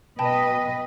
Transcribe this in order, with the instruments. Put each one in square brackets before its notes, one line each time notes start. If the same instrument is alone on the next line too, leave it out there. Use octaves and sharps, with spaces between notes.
[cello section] B2 B4 D#5 [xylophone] G5 A5 B5